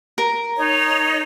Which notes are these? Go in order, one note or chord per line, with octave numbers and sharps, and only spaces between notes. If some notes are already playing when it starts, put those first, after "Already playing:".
A#4
D#4 C#5